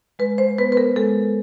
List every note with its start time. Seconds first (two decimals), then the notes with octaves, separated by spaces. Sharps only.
0.19 G#3 B4
0.38 C5
0.58 B3 B4
0.72 B4
0.77 A#4
0.96 G#3 A4